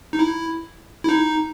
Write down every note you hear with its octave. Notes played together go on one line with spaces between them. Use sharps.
D#4
E4
E4
D#4